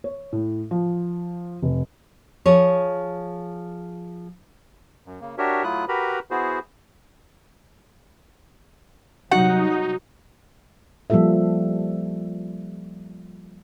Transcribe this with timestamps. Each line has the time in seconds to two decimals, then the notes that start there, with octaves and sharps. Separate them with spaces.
0.04 C#5
0.33 A2
0.71 F3
1.62 F1
2.46 F3 G#4 C#5
5.06 F#2
5.21 C#3 A#3
5.38 D4 F#4 G4 A#4 C#5 E5
5.64 F#3 A3 E4 F4 D#6 F#6
5.88 F#4 G4 A#4 B4 A#5 B5
6.31 B3 E4 F#4 G#4 C5
9.31 C3 F#3 G3 D#4 F#4 F#5
11.10 F3 G3 A#3 F4 A4 E5